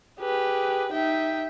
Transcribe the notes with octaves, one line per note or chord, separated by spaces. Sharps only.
G4 G#4 B4
D#4 E5 G5